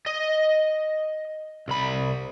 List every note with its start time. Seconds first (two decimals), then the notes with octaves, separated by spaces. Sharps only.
0.06 D#5
1.68 C2 B5